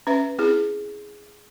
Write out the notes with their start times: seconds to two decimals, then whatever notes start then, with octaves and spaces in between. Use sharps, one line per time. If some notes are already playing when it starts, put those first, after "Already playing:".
0.07 C#4 B4 E5
0.39 C4 E4 G#4